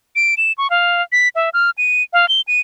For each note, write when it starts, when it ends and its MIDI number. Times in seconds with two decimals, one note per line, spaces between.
0.16 0.35 98
0.37 0.52 100
0.58 0.70 85
0.70 1.02 77
1.12 1.28 95
1.35 1.50 76
1.54 1.70 89
1.78 2.03 99
2.13 2.28 77
2.29 2.41 103
2.48 2.61 99